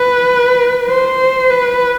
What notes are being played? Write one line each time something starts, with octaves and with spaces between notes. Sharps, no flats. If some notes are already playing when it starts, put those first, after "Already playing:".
Already playing: B4
C5
B4